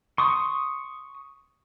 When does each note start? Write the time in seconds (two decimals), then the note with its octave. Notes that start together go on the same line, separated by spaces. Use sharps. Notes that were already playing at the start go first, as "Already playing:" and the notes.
0.18 C6 C#6 D#6